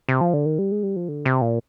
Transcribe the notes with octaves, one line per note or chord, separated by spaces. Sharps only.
C3
F3
D3
D#3
G3
G#3
G3
F3
D3
C3
A#2